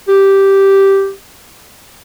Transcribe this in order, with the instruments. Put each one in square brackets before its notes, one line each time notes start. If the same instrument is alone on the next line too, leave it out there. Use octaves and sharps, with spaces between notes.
[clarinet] G4